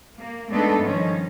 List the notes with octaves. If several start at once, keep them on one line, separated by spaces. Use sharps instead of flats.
A#3
G#3 A3 B3 D4 D#4 A4
G2 D#3 F3 C#4